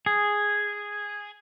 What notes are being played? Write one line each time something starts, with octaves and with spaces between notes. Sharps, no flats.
G#4